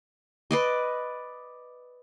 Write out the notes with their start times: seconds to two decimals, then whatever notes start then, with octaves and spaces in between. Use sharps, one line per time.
0.51 B4 D5 D#5